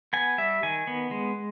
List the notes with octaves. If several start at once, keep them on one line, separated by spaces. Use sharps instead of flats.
B3 G#5
G3 E5
D#3 G#5
B3
G#3